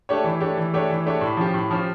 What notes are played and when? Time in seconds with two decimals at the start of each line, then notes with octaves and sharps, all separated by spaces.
0.09 A3 D4 G4 C#5
0.24 E3
0.40 A3 D4 G4 C#5
0.57 E3
0.73 A3 D4 G4 C#5
0.90 E3
1.06 A3 D4 G4 C#5
1.21 A2
1.37 F3 C#4 G4
1.54 A2
1.71 F3 C#4 G4